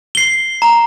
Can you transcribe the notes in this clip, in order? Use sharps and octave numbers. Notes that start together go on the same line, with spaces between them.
C7 G7
A#5